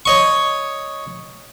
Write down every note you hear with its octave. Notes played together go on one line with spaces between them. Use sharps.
C#5 D#5 C#6